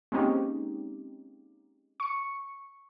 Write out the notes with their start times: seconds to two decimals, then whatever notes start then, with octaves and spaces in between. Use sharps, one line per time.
0.12 G#3 A#3 C4 C#4 D#4 G4
2.00 C#6 C#7